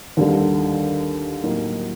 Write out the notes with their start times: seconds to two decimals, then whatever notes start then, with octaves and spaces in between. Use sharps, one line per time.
0.17 D#2 D3 G3
1.42 A2 F#3 A#3 D#4 G4